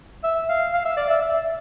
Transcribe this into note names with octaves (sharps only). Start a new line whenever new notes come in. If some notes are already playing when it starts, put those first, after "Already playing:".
E5
F5
F5
E5
D5
E5
E5